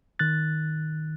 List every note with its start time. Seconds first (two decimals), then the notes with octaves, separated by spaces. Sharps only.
0.19 D#3 F#6 A6